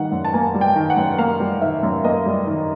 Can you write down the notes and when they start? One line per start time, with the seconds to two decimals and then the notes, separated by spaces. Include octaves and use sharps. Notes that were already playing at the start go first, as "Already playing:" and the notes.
Already playing: D#3 G3 F#5
0.12 F#2
0.24 A5
0.33 A#3 G#5
0.54 G3
0.61 G5
0.76 D#3
0.90 F#5
0.97 F#2
1.18 A#3 F5
1.40 G3
1.61 D#3 E5
1.83 F#2
2.04 A#3 D#5
2.26 G3
2.47 D#3